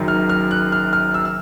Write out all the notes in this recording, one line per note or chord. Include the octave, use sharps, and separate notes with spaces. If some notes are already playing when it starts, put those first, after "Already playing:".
Already playing: F#1 F#2 D#3
F6
F6
F#6
F6
F6
E6
E6